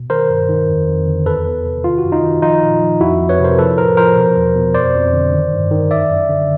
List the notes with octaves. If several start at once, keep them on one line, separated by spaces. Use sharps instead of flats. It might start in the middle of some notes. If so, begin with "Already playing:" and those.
Already playing: B2
D#3 A#4 C5
G2
D#3
F2
F2
D3
E2 A4 B4
E2
C3
D#3 F4
F#4
F#2
D#4 F4
D#3
F3 D#4 F4
A#2
F3
F2 E4 F#4
F2
B4 C#5
C3
A#4 C5
F3 A4 B4
A2 A#4 C5
F3 A#4 C5
B2
E2
B2
F2 C5 D5
F2
D3
D#3
G2
D#3
F#2 D5 E5
F#2
D3